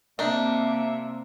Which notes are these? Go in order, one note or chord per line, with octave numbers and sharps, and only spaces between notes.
C3 A#3 D4 D#4 E5